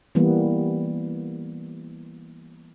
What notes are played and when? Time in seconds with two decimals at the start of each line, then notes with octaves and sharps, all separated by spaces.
0.15 E3 G3 A#3 B3